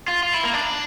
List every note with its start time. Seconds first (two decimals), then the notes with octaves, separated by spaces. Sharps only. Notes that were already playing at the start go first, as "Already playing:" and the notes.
0.08 F4
0.23 F4
0.34 E4
0.44 A#3
0.54 D4